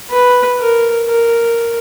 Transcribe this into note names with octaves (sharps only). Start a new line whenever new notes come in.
B4
A#4
A#4